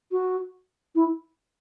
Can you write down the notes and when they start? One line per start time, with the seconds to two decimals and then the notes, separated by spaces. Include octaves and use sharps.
0.12 F#4
0.95 E4